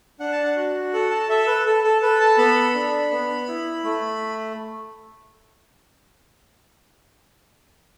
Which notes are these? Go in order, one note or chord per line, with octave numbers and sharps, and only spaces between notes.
D4 F#5
A5
F#5
F#4
A4 F#5
A5
A4 E5
B4
A4
A4
A4 B4
A5
B3 B5
D4
B3
E4
A3